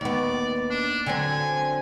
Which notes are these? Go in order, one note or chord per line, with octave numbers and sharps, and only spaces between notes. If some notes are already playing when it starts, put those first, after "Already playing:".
D#2 B3 D5
D4
D3 F#3 C4 G#5